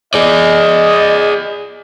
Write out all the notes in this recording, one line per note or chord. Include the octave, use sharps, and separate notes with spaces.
G#4 D5 D#5